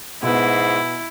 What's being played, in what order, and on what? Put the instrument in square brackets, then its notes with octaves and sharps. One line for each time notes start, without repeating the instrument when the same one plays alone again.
[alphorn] G#2 [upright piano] B2 B3 [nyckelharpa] E4